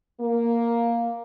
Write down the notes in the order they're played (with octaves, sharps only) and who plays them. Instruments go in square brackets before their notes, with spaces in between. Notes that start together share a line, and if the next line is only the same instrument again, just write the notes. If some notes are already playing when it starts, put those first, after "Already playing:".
[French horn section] A#3